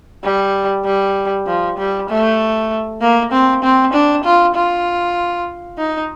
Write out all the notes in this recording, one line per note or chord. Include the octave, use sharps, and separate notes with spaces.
G3
G3
F3
G3
A3
A#3
C4
C4
D4
F4
F4
D#4